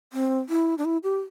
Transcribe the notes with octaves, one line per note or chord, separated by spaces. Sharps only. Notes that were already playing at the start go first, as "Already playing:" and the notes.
C4
E4
D4
E4
G4